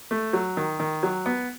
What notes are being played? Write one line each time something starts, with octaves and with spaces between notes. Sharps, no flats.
A3
F#3
D#3
D#3
F#3
B3